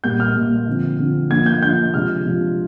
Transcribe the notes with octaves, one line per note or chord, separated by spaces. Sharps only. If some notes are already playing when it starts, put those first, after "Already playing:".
A#2 G3 A#3 G6
F6
A#2 G3 A#3
D3 F3 C4
D3 F3 C4
F3 A#3 D4 G#6
G6
F3 A#3 D4 G6
C3 F3 G#3 D4 F6
C3 F3 G#3 D4